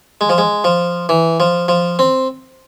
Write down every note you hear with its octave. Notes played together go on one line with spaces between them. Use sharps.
G#3
F3
G#3
F3
E3
F3
F3
C4